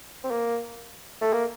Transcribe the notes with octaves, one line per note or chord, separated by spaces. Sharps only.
C4
A#3
A3
A#3